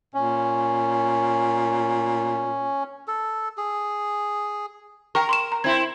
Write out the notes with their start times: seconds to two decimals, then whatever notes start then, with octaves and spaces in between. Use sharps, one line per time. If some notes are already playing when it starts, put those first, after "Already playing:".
0.14 A#2 C#4
3.08 A4
3.57 G#4
5.15 A#4 G5 A#5 C#6
5.29 C6 C#6 E7
5.52 A#5
5.64 C4 E4 G#6